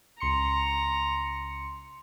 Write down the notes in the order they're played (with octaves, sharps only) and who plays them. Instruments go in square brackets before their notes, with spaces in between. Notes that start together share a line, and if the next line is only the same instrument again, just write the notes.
[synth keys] C#2 C6 C#7 [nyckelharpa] A#5